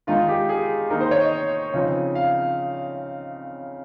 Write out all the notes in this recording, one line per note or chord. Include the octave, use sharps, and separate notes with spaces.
D#3 G#3 D#4 F4
G4
G#4
D#3 A#3 D#4 A#4
C5
C#5
D#5
C#3 F3 C4 D#4
F5